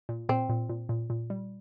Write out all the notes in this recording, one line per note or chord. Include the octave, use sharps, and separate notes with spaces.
A#2
A#2 C4
A#2
A#2
A#2
A#2
G3